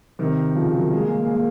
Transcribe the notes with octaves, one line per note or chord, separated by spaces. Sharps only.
C3 D#3
C#3 F3
D#3 F#3
G#3
A#3
G#3
A#3
G#3
A#3